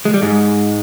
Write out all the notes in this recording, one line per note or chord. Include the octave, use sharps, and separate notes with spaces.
G#3
G3
G#2 G#3